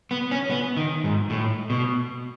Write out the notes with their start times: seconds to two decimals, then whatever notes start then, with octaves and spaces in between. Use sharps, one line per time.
0.11 B3
0.31 C#4
0.50 B3
0.77 D#3
1.04 G#2
1.30 A2
1.70 B2